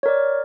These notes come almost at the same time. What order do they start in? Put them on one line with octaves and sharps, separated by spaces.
C#5 A#4 D5